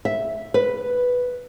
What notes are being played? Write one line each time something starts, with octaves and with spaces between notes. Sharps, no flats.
E5
B4